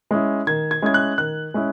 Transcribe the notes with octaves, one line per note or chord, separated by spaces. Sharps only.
G#3 C#4 E4
D#3 G#6
G#6
G#3 C#4 E4 G#6
F#6
D#3 F#6
G#3 C#4 E4